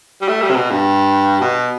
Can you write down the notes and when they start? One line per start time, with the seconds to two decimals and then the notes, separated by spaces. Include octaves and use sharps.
0.21 G3
0.28 A3
0.42 G3
0.50 C3
0.56 B2
0.70 G2
1.41 B2